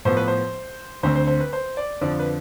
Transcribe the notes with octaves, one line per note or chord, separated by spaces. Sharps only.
A2 F3 B3 C5
B4
C5
D2 D3 A3 C4 C5
C5
C5
B4
C5
D5
F2 D3 F3 D5
B4